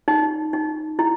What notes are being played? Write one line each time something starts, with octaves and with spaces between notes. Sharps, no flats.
D#4
D#4
E4